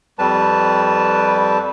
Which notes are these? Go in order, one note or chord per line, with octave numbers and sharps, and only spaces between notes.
F2 G3 B4 A5